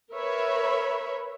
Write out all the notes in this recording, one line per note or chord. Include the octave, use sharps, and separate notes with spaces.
A#4 B4 C#5 E5 B5